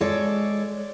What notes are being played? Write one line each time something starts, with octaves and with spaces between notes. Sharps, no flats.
G#3 A4 C#5 D5